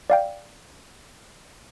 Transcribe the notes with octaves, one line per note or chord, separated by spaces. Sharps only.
D5 F5 G5